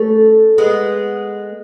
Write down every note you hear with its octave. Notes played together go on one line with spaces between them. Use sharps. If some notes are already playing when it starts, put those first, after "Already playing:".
Already playing: A3 C#4
G#3 B3